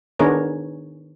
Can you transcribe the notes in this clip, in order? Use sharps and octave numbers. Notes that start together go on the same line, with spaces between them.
D#3 B3 D4 G#4 A#4 C#5